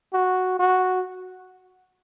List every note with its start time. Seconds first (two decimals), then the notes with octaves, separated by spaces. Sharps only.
0.13 F#4
0.59 F#4